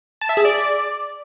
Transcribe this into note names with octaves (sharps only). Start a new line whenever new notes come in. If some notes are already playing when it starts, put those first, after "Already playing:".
A5
E5
G#4
D5